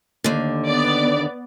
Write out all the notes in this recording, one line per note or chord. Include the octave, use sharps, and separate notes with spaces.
D#2 D3
B3 D5